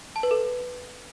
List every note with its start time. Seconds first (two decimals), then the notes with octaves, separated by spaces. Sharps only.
0.16 A5
0.23 B4
0.31 A4